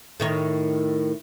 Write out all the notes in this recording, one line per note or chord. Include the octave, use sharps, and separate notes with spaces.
A2 D#3 C#5